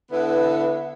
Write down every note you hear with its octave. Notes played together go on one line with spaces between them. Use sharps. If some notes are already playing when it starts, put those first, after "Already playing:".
D3 B3 E4 B4